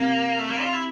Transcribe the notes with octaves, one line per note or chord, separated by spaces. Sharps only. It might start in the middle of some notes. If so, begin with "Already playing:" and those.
Already playing: C3 A#3
A3
A#3
F4
E4